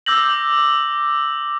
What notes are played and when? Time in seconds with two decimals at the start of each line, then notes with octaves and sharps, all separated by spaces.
0.06 D6 E6 G6 A#6 F#7